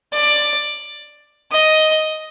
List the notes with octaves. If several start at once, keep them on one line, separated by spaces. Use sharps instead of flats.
D5
D#5